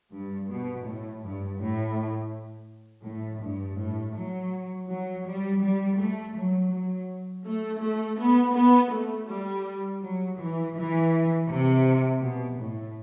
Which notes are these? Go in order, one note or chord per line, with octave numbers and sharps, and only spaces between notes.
G2
B2
A2
G2
A2
A2
G2
A2
F#3
F#3
G3
G3
A3
F#3
F#3
A3
A3
B3
B3
A3
G3
F#3
E3
E3
C3
B2
A2